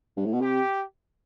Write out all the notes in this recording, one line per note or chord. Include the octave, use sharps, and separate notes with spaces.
G2
A2
B2
C3 G4